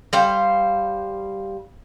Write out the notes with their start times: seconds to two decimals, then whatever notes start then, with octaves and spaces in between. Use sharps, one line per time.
0.13 G3 C5 F5